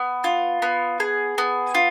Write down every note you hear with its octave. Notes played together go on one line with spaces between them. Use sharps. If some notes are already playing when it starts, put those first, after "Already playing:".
Already playing: B3
F4
B3
G#4
B3
F4